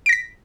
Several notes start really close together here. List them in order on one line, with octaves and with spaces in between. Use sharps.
D7 A#6 B6